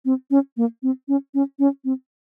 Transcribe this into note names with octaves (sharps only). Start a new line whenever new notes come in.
C4
C#4
A#3
C4
C#4
C#4
C#4
C4